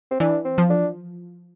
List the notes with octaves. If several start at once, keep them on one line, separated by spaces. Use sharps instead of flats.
C4
E3 D4
C4
F3
D4